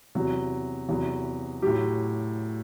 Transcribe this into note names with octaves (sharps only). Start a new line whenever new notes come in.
E2 C3 F#3
E2 C3 F#3
A2 F#3 G4